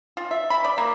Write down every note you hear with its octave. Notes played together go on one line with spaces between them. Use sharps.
F4
E5
B5
D5
A#3